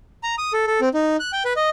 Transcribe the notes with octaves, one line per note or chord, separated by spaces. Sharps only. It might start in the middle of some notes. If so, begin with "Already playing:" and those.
A#5
D#6
A4
A4
C4
D#4
F#6
G5
B4
D#5